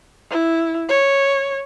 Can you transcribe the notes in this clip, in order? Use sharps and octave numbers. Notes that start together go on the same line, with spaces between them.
E4
C#5